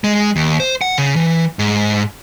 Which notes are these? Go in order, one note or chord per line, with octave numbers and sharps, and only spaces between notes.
G#3
D#2
C5
F#5
C#3
E3
G#2